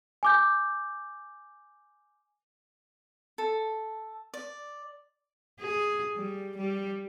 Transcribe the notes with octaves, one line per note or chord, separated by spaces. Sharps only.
G#5 D6 G6
A4
D5
G#4
G3
G3